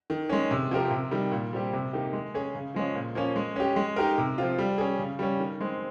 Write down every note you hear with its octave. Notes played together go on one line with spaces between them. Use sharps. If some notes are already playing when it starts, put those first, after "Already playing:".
D#3
G#3 C#4
C3
F3 C4 G4 A#4
C3
D#3 G3
A#2
G3 C4 G4
C3
D#3 A#3 D#4 G4
G#3
C#4 G#4
C#3
F3 G#3 C#4
A#2
F3 A#3 C#4
G#3
C#4 G4
G#3
D#4 G4 A#4
C3
F3 C4 F4
G3
C#4 G#4
C#3
G3 C#4
D#3
G#3 C4